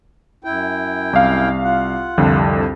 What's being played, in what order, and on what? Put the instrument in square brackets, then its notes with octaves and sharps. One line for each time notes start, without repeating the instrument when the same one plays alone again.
[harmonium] F#2 E4 G5
[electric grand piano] C2 F5
[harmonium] F4 F#5
[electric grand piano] C2 F2 D3